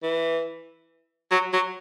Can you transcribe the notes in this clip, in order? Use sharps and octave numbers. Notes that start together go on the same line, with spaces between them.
E3
F#3
F#3